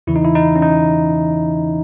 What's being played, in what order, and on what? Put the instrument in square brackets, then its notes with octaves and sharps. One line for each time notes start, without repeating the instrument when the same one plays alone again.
[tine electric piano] E2 C#3 E3 E4
D#4
E4
D#4
C#4
D#4